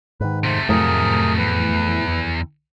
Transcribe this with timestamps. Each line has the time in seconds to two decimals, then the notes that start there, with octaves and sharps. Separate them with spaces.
0.21 G#2 D#3 B4
0.44 C3 A3 C5
0.69 F2 A2 F#3 G#4 A#4
1.38 E2 B4